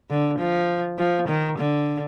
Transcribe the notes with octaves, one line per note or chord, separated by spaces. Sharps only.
D3
F3
F3
D#3
D3